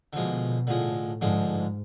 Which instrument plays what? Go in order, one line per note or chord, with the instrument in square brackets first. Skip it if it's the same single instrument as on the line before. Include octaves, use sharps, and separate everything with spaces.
[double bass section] B2 [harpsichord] D3 F3 G#3
[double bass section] A2 [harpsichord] D3 F3 G#3
[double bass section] G#2 [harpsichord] D3 F3 G#3